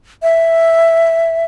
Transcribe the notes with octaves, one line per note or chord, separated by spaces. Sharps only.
E5